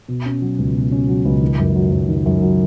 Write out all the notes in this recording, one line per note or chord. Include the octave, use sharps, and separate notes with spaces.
B2
C#4
F#3
C#2
B2
C#4
F#3
C#2
D#3
F#2
F#3
F#2
D#3
F#2
F#3